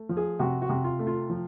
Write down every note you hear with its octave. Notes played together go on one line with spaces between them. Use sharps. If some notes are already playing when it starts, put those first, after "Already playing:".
Already playing: A3
F3
G#4
C3 F#4
F#4
C3
F4
A3
F4
F3